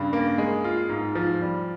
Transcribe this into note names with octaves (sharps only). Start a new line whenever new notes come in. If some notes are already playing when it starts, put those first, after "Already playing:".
Already playing: G2 C#3
A#3
G#3
F4
G#2
F3
G3